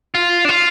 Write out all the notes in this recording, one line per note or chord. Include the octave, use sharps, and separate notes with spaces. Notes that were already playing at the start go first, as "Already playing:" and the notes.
F4
D4
F4